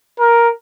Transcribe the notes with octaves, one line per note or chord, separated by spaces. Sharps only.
A#4